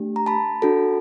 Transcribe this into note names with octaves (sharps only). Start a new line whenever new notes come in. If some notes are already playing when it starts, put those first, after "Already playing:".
Already playing: A3 D4 G4
A#5
A5 B5
D4 F#4 A4